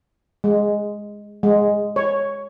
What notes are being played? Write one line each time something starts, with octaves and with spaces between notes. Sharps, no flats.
G#3
G#3
C#5